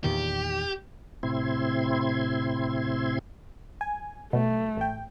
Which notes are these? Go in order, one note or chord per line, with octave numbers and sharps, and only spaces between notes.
E2 A#2 D#3 G4
A2 C3 C4 E4 C6 G#6
G#5
B2 F#3 A3
A1 G5